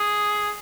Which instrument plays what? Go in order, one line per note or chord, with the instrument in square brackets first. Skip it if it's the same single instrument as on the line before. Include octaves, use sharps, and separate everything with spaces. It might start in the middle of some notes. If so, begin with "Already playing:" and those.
Already playing: [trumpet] G#4